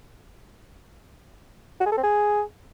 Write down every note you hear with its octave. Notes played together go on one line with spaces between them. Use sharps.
F#4
G#4
A4
C4
G#4